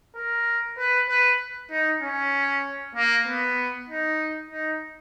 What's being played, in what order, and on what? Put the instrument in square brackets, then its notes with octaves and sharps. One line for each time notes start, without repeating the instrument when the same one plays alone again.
[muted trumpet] A#4
B4
B4
D#4
C#4
A#3
B3
D#4
D#4